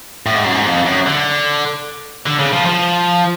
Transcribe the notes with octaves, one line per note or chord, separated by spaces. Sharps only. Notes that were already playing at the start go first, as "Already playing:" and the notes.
A2
G#2
F#2
G#2
F2
F#2
D3
D3
C#3
F3
F3